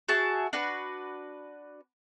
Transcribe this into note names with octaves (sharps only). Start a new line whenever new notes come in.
F#4 G#4 E5 A5
D4 F#4 B4